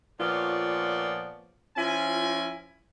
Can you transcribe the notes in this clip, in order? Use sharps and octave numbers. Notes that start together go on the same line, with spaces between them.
A#2 F3 B3 F4 C#5 D5
F3 C#4 E4 F4 G#5